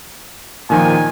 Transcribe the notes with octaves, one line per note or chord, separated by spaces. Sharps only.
A#2 D#3 F3 G#5